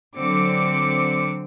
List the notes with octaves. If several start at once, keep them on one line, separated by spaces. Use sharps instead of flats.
D3 F#3 C4 D6 C#7